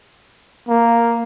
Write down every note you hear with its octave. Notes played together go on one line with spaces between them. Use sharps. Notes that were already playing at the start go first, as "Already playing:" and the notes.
A#3